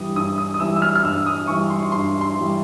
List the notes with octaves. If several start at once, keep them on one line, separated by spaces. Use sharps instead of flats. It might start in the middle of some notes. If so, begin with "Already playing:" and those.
Already playing: G2 E3 G3 D#6
G2 D#6
D#6
D#6
E3 G3 E6
E6
F6
F6
G2 E6
D#6
E3 G3 C#6
C6
G2 C6
C6
E3 G3